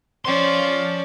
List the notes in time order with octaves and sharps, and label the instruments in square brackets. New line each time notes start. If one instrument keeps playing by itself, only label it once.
[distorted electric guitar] F3 C6 [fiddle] C#4 D5